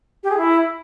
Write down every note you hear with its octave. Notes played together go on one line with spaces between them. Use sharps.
G4
G#4
E4